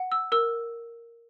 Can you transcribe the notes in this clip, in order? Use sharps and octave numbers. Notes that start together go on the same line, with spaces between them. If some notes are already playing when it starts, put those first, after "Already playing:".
Already playing: F#5
E6
A#4 E6